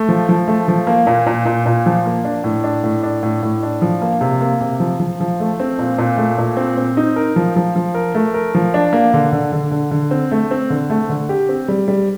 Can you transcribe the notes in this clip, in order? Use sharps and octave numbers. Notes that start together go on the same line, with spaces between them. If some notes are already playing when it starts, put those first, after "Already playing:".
Already playing: A3
F3
F3
A3
F3
A#3
A#2
A#2
A#2
A#2
F3
A#3
D4
A2
D4
A2
D4
A2
A2
D4
F3
A#3
C3
A#3
C3
F3
F3
F3
A3
C4
A#2
A#2
A3
A#2
C4
C4
D#4
A#4
F3
F3
F3
A#4
A3
A#4
F3
D4
A#3
D3
D3
D3
D3
D3
C4
A3
C4
D3
A3
D3
G4
C4
G3
G3